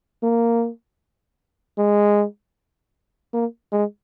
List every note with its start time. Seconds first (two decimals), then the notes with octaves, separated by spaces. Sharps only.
0.23 A#3
1.78 G#3
3.34 A#3
3.72 G#3